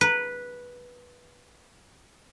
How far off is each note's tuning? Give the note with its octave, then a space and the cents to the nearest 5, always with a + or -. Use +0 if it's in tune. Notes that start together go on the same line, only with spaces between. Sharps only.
B4 -10